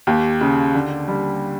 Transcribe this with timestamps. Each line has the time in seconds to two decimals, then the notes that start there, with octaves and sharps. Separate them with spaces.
0.07 D#2 G4
0.41 C#3
0.75 D3
1.08 G3